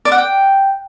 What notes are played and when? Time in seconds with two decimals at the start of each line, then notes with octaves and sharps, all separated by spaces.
0.05 D5
0.12 F#5
0.18 G5